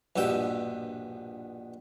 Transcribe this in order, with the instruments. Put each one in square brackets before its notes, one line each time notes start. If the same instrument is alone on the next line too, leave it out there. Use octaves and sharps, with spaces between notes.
[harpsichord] A#1 G2 B2 E5 G5